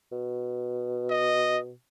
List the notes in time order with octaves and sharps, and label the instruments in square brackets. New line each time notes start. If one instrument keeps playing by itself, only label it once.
[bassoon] B2
[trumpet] D#5